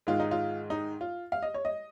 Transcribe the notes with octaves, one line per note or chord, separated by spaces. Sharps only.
G#2 D#3 G#3 F4
D#4
F4
D#4
F4
F5
D#5
C#5
D#5